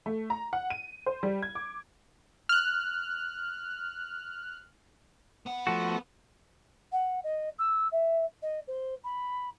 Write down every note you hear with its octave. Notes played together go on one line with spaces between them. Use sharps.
A3
A#5
F#5
D#7
C5
G3
G#6
D6
F6 F#6
B3 F#5
F3 A3 F#4
F#5
D#5
E6
E5
D#5
C5
B5